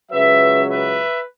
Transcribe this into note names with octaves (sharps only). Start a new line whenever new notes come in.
C#2 C#3 F#3 B4 E5
B4 E5